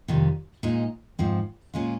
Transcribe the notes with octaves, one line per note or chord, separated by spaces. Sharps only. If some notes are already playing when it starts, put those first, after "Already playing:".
F2 C3 D#3 G3
A#2 G#3 D#4
G#2 F3 C4
A#2 G#3 C#4 F4